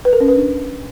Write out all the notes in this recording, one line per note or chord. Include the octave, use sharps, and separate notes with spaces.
B4
A#4
C#4
B4
D4